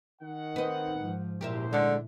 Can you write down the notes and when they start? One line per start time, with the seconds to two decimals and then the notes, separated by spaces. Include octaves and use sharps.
0.22 D#3 F#5
0.56 C4 D#4 B4 D#5
0.99 G#2 F3
1.41 F#1 D2 A#2 E4 G4 A#4 C5 E5
1.73 D3 G#3 A4